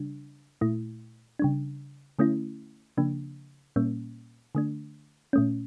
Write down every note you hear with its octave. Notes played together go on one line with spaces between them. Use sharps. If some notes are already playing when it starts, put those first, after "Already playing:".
Already playing: C#3 G3 D4
A#2 A3 E4
C#3 G3 D4
D3 A3 C#4 E4
C#3 F3 A#3 D4
A#2 G3 A#3 C#4
D3 A3 D4
A#2 A3 C#4